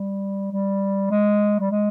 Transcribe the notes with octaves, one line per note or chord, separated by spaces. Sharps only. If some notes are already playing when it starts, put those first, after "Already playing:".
Already playing: G3
G3
G#3
G3
G#3